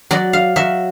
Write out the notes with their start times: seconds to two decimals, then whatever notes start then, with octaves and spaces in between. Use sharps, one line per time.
0.11 F#3 D5
0.33 F5
0.56 F#3 E5